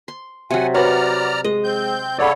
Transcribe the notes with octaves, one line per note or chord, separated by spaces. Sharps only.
C6
C3 F#3 F#5 G#5
F#4 B4 C#5 D5 F#5 A#5 F6
G#3 D#5
C4 G6
C#3 A4 C#5 D5 F#5 B5